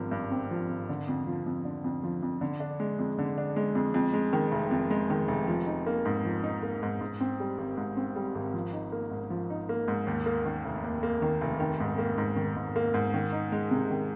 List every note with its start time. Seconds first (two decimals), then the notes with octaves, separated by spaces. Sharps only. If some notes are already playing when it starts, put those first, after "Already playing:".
Already playing: G#1 G2 F3
0.11 G2
0.31 C4
0.51 F3
0.69 G#1
0.89 D3
1.08 F2
1.27 F3
1.46 F2
1.65 D3
1.84 F2
2.03 F3
2.23 F2
2.41 D3
2.60 D4
2.80 G#3
2.99 F2
3.19 D3
3.38 D4
3.56 G#3
3.75 F2
3.94 F2
4.13 G#3
4.33 D#3
4.52 F1
4.71 F2
4.90 G#3
5.10 D#3
5.28 F1
5.48 F3
5.67 D#4
5.86 A#3
6.05 G#2
6.25 F3
6.43 D#4
6.62 A#3
6.83 G#2
7.01 G#2
7.21 C4
7.40 G3
7.58 G#1
7.77 G#2
7.97 C4
8.16 G3
8.35 G#1
8.54 F3
8.73 D#4
8.92 A#3
9.11 G#2
9.30 F3
9.50 D#4
9.69 A#3
9.88 G#2
10.07 D#2
10.26 A#3
10.45 D#3
10.65 F1
10.84 D#2
11.03 A#3
11.22 D#3
11.41 F1
11.60 D#3
11.80 G#2
11.98 A#3
12.18 G#2
12.36 D#3
12.56 G#2
12.76 A#3
12.94 G#2
13.14 D#3
13.33 D#4
13.52 G#3
13.71 C3
13.90 D#3